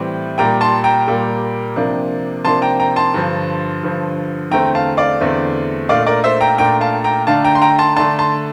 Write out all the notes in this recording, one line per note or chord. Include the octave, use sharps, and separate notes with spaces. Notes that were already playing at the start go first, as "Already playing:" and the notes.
Already playing: A2 E3 G3 C4
A#2 G3 A#3 G5 A#5
A5 C6
G5 A#5
A#2 G3 A#3
C3 F3 A#3 D4
C3 F3 A#3 D4 A5 C6
G5 A#5
G5 A#5
A5 C6
G2 D3 F3
G2 D3 F3
E2 D3 A3 C4 G5 A#5
F5 A5
D5 F5
E2 D3 A3 C4
A#2 A3 D4 D5 F5
A#4 D5
C5 E5
G5 A#5
A#2 A3 D4 G5 A#5
F5 A5
G5 A#5
D3 A3 D4 F5 A5
G5 A#5
C6
G5 A#5
A5 C6
D3 A3 D4 A5 C6
A5 C6